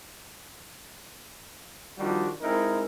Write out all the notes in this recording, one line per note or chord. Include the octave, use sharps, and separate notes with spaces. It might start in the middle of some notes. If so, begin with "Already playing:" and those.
D#3 F3 G3 D4 F4 F#4
G#3 C4 D#4 E4 A#4